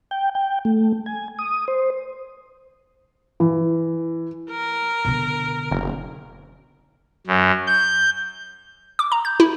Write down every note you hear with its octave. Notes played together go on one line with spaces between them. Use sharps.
G5
G5
A3
G#5
D#6
C5
E3
A#4
B2 D3
F#1
F#2
G6
D6
A#5
G6
E4